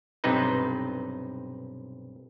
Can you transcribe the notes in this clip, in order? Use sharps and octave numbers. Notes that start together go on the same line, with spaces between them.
B1 G2 C3 C4 D#4 B4